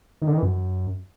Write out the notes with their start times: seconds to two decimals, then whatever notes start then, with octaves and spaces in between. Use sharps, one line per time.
0.22 D#3
0.27 D3
0.32 D#3
0.37 E3
0.43 F#2